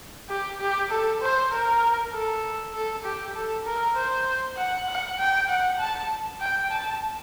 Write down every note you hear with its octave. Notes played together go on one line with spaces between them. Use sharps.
G4
G4
A4
C5
A#4
A4
A4
G4
A4
A#4
C5
F#5
F#5
G5
F#5
A5
G5
A5